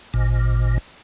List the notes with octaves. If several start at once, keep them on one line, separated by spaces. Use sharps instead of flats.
G#1 A#2